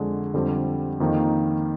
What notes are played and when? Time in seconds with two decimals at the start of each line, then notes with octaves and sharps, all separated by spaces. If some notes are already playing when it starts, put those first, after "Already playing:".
Already playing: F2 D3 G#3
0.34 F2 D3 G3 C4
1.00 F2 D#3 A#3 D#4